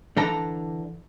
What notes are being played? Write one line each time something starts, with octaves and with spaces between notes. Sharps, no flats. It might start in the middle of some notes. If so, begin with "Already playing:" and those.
D3 E3 D4 A4 A#5